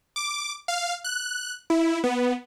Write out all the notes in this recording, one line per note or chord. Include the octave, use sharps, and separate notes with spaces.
D6
F5
F#6
E4
B3